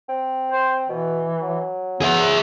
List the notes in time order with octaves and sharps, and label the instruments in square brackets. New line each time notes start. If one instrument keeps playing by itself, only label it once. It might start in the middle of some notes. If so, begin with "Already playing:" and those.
[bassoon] C4
[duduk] C5
[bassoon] B2 [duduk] E3
[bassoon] F#3
[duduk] B3 [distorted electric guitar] G#4 E5